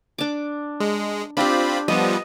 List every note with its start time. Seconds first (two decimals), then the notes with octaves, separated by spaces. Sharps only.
0.18 D4 D6
0.80 G#3
1.37 C4 D4 F4 G4 B5
1.88 F3 G3 B3 D#5